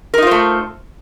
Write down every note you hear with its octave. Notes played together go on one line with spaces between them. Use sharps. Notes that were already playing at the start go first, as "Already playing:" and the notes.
A3 D#4 F4 A#4 C5